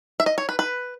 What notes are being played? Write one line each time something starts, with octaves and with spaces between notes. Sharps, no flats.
E5
D#5
C#5
B4
B4